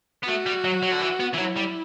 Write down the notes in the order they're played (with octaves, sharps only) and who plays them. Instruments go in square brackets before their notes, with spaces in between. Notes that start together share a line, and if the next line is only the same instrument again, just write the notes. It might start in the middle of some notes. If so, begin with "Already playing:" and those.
[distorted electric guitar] B3
[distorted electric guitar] A3 [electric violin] F#4
[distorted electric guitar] G3
F#3
F#3
D3
E3
B3
E3
[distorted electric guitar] F#3 [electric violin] E4
[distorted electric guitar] G3